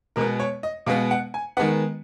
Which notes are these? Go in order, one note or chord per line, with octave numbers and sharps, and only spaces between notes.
B2 G#3 B3 A#4
C#5
D#5
B2 G#3 B3 F5
F#5
G#5
D#3 G#3 B3 F#5